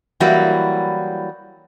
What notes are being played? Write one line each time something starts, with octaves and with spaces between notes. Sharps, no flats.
E3 F#3 G3 A#3 E4 F#4